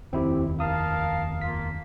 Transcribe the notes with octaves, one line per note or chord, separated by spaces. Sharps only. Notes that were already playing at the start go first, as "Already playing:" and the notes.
F1 D#2 C4 E4 G4
A#4 F5 A5 D#6
A#3 F4 B6